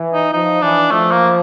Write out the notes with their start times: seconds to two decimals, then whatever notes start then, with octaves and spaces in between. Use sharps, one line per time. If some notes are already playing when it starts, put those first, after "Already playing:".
Already playing: E3
0.14 D#4
0.33 F3 D#4
0.62 E3 D4
0.91 F3 A3
1.12 A#3